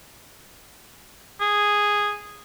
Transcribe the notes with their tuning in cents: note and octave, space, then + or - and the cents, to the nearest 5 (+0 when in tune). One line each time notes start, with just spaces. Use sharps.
G#4 -5